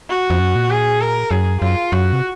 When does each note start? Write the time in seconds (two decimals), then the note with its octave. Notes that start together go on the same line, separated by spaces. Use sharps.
0.10 F#4
0.30 F2
0.40 F#2
0.56 A#2
0.70 G#4
1.01 A#4
1.31 F#2 G#4
1.61 F#2 F4
1.92 F#2 F#4
2.13 C3